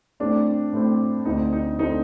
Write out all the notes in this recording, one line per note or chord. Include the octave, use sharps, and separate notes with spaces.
A2 A3 C4 D4
A2 A3 C4
D2 D3 A3 C4 D#4
D#4
D2 D3 A3 C4 D#4